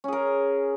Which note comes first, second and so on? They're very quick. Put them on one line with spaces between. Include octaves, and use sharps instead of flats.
C#4 G#4 A#4